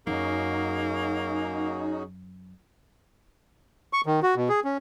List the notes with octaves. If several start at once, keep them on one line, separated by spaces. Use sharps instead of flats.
F#2 A#3 C#4 D#4 F#4 G#4
C#6
D#3
F#4
B2
G#4
C#4